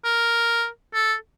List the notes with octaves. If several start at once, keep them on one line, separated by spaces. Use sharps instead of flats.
A#4
A4